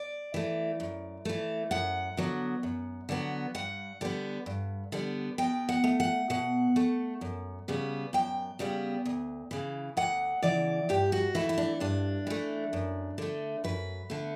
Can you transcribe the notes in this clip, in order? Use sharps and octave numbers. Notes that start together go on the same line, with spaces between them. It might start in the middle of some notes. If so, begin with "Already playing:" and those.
Already playing: D5
E3 A3
F#2
E3 A3
F#2 F#5
D3 F#3 B3
F#2
D3 F#3 B3
G2 F#5
D3 G3 B3
G2
D3 G3 B3
B2 G5
F#5
A3
F#5
B2 F#5
A3
F#2
C#3 G3 B3
F#2 G5
C#3 G3 B3
D2
C#3 E3
D2 F#5
C#3 E3 D5
G2 G4
F#4
E3 A3 E4
E4
D4
G2 D4
E3 A3
F#2
D3 A3
F#2 B4
D3 A3